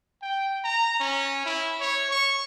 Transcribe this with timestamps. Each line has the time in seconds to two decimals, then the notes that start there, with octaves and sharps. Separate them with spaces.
0.22 G5
0.64 A#5
1.00 C#4
1.45 E4
1.80 C#5
2.11 C#6